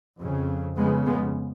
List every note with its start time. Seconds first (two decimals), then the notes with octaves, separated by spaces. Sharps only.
0.19 F2 C#3
0.77 F2 C#3 G#3 B3
1.06 G#3 B3